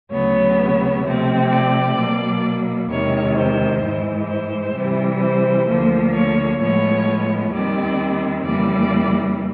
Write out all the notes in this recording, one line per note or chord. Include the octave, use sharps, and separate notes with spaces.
D2 C#3 F#3 B3 C#5
C3 F3 A3 C4
D5
B2 F#3 A#3
E2 C3 D#3 G#3 C#5
C5
G#2 E3 G#3
C5
C3 E3 G3
C5
D2 D3 F3 A#3
C#5
A2 F3 G#3 B3 C#5
D#2 D#3 G3 C4 D5
F2 C#3 E3 G3 A#3 D5